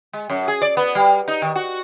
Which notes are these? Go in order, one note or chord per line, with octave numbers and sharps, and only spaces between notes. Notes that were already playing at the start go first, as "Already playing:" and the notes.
G#3
F#2
G#4
D5
B3
G3
D#4
D#3
F#4